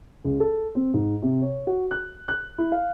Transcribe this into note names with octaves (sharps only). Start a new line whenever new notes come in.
C#2
A4
C4
G#2
C3
C#5
F#4
F#6
F#6
E4
F5